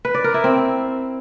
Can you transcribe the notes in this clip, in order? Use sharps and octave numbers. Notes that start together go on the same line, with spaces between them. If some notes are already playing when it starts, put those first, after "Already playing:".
B4
D5
A#4
E4
C4